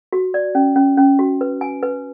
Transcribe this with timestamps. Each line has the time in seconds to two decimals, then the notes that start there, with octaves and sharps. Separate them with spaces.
0.13 F#4
0.34 D5
0.55 C#4
0.76 C#4
0.98 C#4
1.19 F#4
1.41 B4
1.61 G#5
1.83 B4